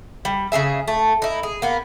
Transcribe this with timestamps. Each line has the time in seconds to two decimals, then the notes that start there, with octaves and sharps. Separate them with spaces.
0.25 G3
0.52 C#3 F3 G#4 E5
0.88 A3
1.22 D#4 E4
1.43 G#4
1.62 A#3 B3